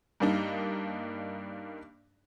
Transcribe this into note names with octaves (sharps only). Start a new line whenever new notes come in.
G2 G3 A#3 D4 D#4